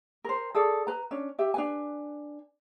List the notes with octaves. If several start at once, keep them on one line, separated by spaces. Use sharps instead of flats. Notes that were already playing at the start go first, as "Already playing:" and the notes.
A#4 C5
G#4 A4 D5
B4 A#5
C#4 D4
G4 E5
D4 B4 G#5